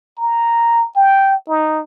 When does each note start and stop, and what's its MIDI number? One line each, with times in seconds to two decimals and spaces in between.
0.18 0.88 82
0.96 1.35 79
1.48 1.81 63